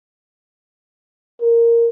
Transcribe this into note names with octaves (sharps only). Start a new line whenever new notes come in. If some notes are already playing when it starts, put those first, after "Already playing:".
A#4